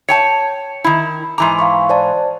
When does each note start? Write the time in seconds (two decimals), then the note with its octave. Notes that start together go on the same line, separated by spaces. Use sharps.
0.09 C#5 G5 A5 C#7
0.84 D#3 E4
1.38 G#2 E3 A#5 C6 D6
1.59 F5 C6 C#6
1.89 C5 D5 A5